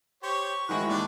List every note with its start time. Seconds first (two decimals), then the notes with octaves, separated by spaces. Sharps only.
0.23 G4 C5 C#5 C#6
0.69 D#3 G#3 E4 F#4 C5 F#5
0.89 D#2 D4 D5